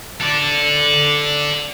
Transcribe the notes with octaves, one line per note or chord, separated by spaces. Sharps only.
A4 D5